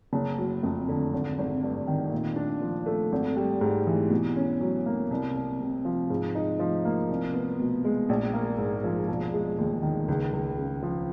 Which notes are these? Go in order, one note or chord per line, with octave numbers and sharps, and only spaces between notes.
F#1
F#3
F2
D3
G#1
G#1
G2
D#3
A#2
D4
F3
A3
G#1
G3
G#2
E3
B2
C#4
F#3
A#3
C2
C2
C3
F3
G#2
D#4
F3
A#3
C2
B3
B2
G#3
A#1
A#3
G#2
F3
E1
G#3
D#2
D#3
C#2
C#2
C#3
F3